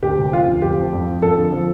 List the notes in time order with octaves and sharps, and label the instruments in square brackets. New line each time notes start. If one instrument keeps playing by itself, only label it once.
[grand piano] D2 G4
C3
F3 F4
D2
F2 G4
F3
F2
F3
F2 A4
D3
F3